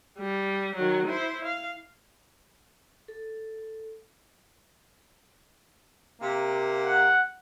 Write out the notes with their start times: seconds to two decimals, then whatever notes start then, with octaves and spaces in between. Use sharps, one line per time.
0.19 G3
0.75 D#3 F#3
1.06 E4 C5
1.45 F5
3.08 A4
6.20 C3 A#3
6.85 F#5